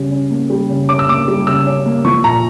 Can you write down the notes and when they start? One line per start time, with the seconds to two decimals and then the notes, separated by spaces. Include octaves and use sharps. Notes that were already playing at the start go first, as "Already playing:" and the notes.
Already playing: C#3 G3
0.11 C#4
0.30 A#3
0.50 G3
0.69 C#3
0.89 C#4 D6
0.99 E6
1.08 A#3 D6
1.28 G3
1.47 C#3 E6
1.67 C#4
1.86 A#3
2.05 F3 C#6
2.24 A#2 A#5